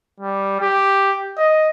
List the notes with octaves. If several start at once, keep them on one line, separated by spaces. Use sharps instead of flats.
G3
G4
D#5